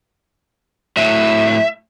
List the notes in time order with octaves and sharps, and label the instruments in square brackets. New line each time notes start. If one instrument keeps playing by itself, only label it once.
[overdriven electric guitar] A2 F#3 [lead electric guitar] E5